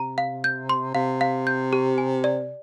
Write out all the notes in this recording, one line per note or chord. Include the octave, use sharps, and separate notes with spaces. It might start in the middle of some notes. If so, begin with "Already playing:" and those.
Already playing: C3 A#5
F5
G6
C6
C3 F5
F5
G6
G4
G#5
D5